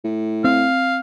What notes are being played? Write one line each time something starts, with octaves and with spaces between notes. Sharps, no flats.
A2
C4 F5